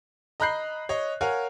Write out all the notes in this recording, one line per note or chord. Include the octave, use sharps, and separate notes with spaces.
D#5 A#5 B5 F#6 G6 C7
C#5 D#5
A#4 C#5 F5 F#5 G#5